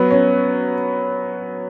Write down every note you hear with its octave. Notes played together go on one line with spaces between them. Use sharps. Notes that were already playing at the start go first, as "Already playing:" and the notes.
Already playing: F#3 B3
C#4